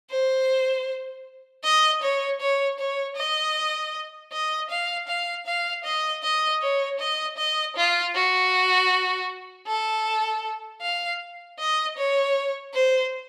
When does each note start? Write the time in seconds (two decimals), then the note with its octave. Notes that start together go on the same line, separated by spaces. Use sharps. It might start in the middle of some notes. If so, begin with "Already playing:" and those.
0.10 C5
1.64 D#5
2.02 C#5
2.41 C#5
2.79 C#5
3.16 D#5
4.32 D#5
4.70 F5
5.08 F5
5.46 F5
5.84 D#5
6.23 D#5
6.62 C#5
6.99 D#5
7.37 D#5
7.76 F4
8.15 F#4
9.67 A4
10.82 F5
11.59 D#5
11.97 C#5
12.74 C5